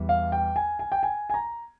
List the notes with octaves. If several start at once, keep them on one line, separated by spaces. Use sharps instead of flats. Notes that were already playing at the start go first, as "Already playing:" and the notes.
Already playing: E2 E3 G3
F5
G5
G#5
G#5
G5
G#5
G#5
A#5